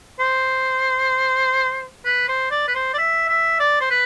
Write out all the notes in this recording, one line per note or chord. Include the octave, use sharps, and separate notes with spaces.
C5
B4
C5
D5
B4
C5
D5
E5
E5
D5
C5
B4